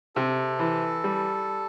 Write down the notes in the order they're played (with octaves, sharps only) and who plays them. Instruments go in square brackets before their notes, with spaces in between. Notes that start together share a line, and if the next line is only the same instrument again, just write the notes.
[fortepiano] C3 [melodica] A4
[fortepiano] E3
G3